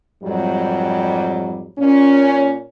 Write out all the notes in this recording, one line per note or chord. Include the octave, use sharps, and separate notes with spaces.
F2 G#2 F#3 G3
A#2 C#4